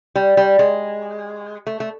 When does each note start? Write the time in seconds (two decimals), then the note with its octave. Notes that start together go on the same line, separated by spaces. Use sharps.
0.15 G3
0.37 G3
0.59 G#3
1.67 A3
1.80 A3